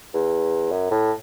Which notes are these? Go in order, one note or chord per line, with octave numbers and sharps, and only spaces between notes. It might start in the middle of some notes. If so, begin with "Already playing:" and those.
E2
F#2
A2